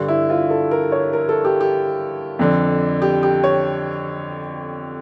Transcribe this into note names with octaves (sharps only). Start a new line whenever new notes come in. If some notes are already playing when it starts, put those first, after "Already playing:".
Already playing: G2 D3
E4
F4
A4
A#4
C#5
A#4
A4
G4
G4
F2 D3
G4
G4
C#5